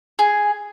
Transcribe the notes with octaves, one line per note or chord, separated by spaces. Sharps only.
G#4